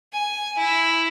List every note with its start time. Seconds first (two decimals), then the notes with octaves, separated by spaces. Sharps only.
0.12 G#5
0.58 E4